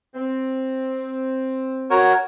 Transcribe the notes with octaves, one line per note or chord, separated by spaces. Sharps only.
C4
F#4 A#4 C#5